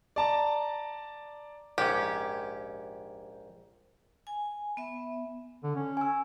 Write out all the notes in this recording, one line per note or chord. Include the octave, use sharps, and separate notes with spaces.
D5 A5 A#5
A#1 G#2 C#4 G4
G#5
B3 E5
D3
C#4
G#5 E6